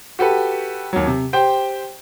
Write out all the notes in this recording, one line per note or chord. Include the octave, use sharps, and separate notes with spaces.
F#4 G4 A4 B4
D#2 F#3
C3
G4 C5 G5